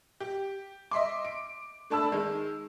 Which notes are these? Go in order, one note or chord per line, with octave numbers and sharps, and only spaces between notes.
G4
D#5 E5 C6 D6
D7
A3 D4 A5 B5 E6
D#3 G#3